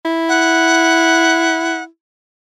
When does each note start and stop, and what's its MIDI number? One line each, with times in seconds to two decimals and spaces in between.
0.05 1.86 64
0.29 1.83 78